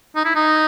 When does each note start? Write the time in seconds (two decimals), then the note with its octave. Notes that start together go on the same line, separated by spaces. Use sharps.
0.16 D#4
0.25 E4
0.35 D#4